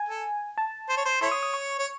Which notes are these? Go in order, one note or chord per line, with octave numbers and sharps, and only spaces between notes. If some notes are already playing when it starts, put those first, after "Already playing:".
Already playing: G#5
A4
A5
C5
C#5
C5
E4 A4 C#5 C6
D#6
D#6
C#6
C#5